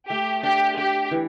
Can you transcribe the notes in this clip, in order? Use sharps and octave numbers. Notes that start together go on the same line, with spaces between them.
A3 G4
D4 G4
D4 G4
E3